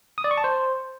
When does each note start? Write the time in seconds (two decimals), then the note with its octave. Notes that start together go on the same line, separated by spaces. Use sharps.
0.18 D#6
0.24 D5
0.31 C#6
0.38 A5
0.44 C5